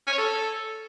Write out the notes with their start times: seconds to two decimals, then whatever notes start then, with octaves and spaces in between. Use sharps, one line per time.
0.07 C#4
0.12 C#5
0.18 A4